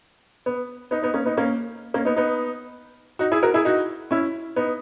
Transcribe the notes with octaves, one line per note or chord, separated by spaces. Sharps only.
B3
B3 D#4
B3 D#4
A#3 C#4
B3 D#4
A#3 C#4
A#3 C#4
B3 D#4
B3 D#4
D#4 F#4
E4 G#4
F#4 A#4
E4 G#4
D#4 F#4
C#4 E4
B3 D#4